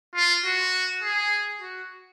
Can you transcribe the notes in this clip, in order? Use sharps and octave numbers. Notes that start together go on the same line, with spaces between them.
F4
F#4
G#4
F#4